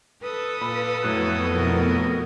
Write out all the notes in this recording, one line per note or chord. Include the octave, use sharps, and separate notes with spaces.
A4 B4 D#6
A#2 F5 B5
F2 A2 F#3 B3 F#6
B2 A#4